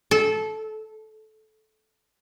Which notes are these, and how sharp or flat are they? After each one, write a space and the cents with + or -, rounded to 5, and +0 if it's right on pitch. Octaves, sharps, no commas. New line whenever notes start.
A4 -20